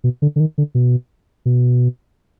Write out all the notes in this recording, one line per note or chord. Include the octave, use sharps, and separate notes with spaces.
B2
D3
D3
D#3
D3
B2
B2